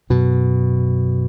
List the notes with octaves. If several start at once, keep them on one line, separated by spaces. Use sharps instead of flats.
F#2 B2